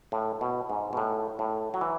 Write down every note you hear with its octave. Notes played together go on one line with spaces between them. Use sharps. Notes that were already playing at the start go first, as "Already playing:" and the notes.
A2
B2
G#2
B2
A2
A2
F#3
E3